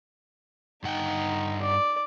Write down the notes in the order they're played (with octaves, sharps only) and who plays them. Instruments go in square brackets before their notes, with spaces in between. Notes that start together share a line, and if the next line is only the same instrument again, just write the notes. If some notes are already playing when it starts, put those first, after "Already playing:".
[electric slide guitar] G2 F#5 G5 [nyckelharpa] D#4
[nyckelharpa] D5